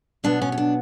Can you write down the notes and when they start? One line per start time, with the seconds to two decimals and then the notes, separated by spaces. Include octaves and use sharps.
0.24 B2 F#3 B3 D4
0.42 C#4
0.52 C#4
0.58 D4